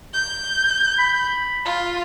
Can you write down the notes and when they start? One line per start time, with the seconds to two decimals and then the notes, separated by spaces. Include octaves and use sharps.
0.14 G6
0.98 B5
1.66 F4